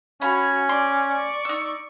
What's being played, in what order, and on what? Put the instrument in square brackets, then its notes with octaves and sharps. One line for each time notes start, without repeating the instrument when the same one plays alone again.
[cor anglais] C#4 [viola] F#4 [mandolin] F5 G#5 B5
[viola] D5 [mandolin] C6
[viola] D5 C#6
[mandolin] D#4 E6